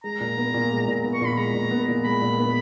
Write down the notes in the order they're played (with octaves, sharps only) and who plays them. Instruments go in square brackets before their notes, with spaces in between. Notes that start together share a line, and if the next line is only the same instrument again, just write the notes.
[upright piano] G#3 [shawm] A#5
[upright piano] A#2
B3
A#2
G#3
A#2
B3
[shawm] C#6
[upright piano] A#2
[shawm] B5
[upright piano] G#3 [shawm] A#5
[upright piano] A#2
B3
A#2
[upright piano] G#3 [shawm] B5
[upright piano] A#2
B3